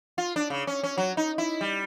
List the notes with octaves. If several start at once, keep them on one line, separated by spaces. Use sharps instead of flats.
F4
D4
C#3
C#4
C#4
F#3
D#4
E4
G3